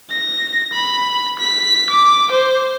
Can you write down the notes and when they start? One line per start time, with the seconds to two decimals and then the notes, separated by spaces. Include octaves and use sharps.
0.10 A#6
0.73 B5
1.39 B6
1.90 D6
2.31 C5